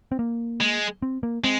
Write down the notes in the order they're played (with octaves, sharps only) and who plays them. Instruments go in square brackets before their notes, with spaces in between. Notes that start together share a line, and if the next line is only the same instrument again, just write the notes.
[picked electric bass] C4
A#3
[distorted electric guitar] G#3
[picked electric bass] C4
A#3
[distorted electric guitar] G#3 [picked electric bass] C4